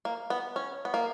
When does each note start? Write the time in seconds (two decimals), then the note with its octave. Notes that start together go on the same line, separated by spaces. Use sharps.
0.05 A#3
0.30 B3
0.56 C#4
0.85 B3
0.94 A#3